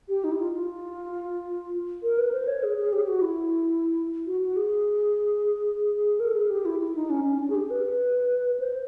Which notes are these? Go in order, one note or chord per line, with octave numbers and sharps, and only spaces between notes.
G4
D#4
E4
F4
F4
A#4
B4
C5
C#5
G#4
G#4
G4
F#4
E4
F#4
F#4
G#4
A#4
A4
G#4
G4
E4
E4
D#4
C#4
C#4
D4
G#4
G4
B4
C5